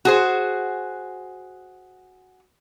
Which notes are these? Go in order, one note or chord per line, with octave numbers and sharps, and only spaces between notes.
F#4 G#4 C5